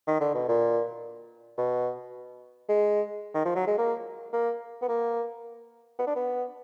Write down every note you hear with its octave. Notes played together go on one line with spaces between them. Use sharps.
D#3
D3
B2
A#2
B2
G#3
D#3
F3
F#3
G#3
A#3
A#3
B3
A#3
B3
D4
B3